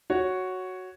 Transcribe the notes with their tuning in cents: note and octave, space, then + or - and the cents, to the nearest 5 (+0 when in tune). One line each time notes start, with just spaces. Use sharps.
F#4 +0 C#5 +0